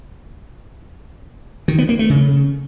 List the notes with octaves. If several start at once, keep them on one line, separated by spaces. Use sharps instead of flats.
D#3
B3
A#3
A3
C#3